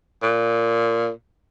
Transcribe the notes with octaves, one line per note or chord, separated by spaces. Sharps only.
A#2